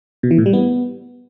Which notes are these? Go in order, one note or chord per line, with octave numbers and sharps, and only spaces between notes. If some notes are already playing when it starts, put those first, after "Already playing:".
B2
E3
A2
G3
B3